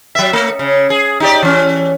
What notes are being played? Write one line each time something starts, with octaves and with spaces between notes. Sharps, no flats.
F#3 E5
A3
C#3
G#4
D#4 G4 D5
E3 C#4